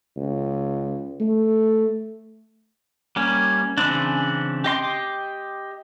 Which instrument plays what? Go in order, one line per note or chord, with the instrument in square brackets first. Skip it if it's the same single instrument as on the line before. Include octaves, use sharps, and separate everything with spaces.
[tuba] C#2
A3
[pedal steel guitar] G3 A#3 C#4
C#3 E3 C4 D4
G4 D#5 C6 D6